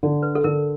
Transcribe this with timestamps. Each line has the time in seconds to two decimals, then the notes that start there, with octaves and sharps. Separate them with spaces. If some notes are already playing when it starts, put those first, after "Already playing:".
0.03 D3
0.23 B4
0.35 A4
0.44 D3 A#4